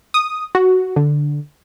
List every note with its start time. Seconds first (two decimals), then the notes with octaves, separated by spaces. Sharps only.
0.14 D#6
0.55 F#4
0.96 D3